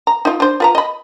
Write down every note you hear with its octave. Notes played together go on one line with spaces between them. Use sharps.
A#5
D#4 F4
D4 C5
F4 B4 A#5
D#5 B5